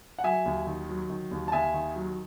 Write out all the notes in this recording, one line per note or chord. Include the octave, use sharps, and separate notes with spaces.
F#5
F#3 E5 G#5
D#2
D#3
F#3
D#3
D#2
A5
D#2 E5 G#5
D#3
F#3